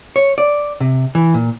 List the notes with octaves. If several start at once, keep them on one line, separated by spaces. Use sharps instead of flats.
C#5
D5
C3
E3
A#2